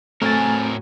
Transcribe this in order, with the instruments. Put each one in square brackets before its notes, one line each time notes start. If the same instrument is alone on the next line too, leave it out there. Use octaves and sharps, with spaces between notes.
[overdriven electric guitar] A2 A#4 [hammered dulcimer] F#3 C#5 G#5 [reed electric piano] A3 A6 [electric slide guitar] C4